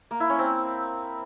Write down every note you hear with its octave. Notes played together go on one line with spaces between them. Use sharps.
A#3
E4
C#4
C4